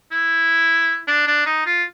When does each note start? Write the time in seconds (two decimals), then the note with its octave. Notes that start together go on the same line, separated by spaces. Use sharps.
0.12 E4
1.08 D4
1.27 D4
1.46 D#4
1.66 F4